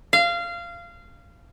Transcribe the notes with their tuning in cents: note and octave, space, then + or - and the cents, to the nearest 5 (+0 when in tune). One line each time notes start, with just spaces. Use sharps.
F5 -20